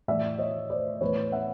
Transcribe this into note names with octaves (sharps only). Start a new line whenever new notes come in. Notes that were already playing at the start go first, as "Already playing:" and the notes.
A2 E3 D5 E5
C#5 D#5
C5 D5
A2 E3 B4 C#5
E5 F#5